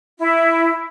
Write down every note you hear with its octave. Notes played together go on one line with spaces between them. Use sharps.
E4